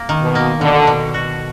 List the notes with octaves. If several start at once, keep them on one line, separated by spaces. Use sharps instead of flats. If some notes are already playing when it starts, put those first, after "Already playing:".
Already playing: A#3
D#3
B2
A#3
B2 D3
B2
F#4